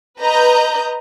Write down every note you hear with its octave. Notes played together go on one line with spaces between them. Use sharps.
B4 D#5 A#5 G6